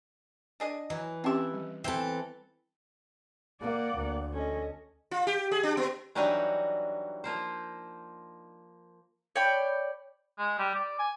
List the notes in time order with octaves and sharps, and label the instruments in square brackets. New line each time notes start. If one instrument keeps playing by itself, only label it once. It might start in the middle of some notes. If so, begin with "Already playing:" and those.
[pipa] D4 G#4 D#5
[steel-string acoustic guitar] E3 [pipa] F#3 [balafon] D#5
[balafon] C4 C#4 G4 [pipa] F4 E5
[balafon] G3
[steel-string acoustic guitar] E3 C4 A4 [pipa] C5 E5 G5
[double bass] A#3 [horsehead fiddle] D5 F#5
[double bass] D2 [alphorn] A#3
[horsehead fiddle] C#4 D#5 [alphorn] A4
[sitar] F4
G4
G#4
D4
B3
[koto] E3 F#3 G3 D4 D#4 F#4
F3 A#3 C5
[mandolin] C#5 D5 G5 B5
[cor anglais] G#3
G3
D5
G#5